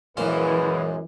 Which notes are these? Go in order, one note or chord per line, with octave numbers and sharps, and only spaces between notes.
F#2 A#2 E3 G#3 B4 C5 F5